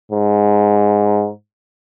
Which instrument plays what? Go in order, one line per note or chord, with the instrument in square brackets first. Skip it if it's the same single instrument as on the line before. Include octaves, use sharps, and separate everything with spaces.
[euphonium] G#2